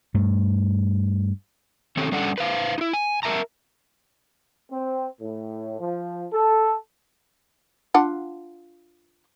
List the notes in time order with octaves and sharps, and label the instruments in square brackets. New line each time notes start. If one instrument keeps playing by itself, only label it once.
[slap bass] G2 A3
[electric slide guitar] D#3 C4 C#4 G4 A4 C#5
G3 C#4 D4 A4 F#5
B4 C5 F5
D#4 E4
G#5
A#4 E5 A5 A#5
[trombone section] C4
A2
F3
A4
[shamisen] D4 F4 F#5